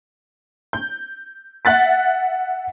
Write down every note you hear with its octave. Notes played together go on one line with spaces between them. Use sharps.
G6
E5 F#5 F#6 A6 B6